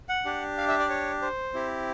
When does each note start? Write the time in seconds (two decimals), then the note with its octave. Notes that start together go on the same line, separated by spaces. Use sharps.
0.09 F#5
0.25 D4 G4
0.58 F5
0.68 E5
0.79 D5
0.89 C#5
1.22 C5
1.53 C4 E4 G4